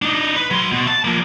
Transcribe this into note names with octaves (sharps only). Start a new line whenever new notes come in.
D4 D#4
B4
F#3 C6
B2
A5
F3 A#3